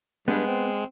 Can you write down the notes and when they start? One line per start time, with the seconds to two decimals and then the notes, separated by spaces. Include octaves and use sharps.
0.28 G2 G#3 B3
0.47 C4